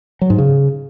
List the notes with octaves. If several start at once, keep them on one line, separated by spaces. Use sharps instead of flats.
F#3
G#2
C#3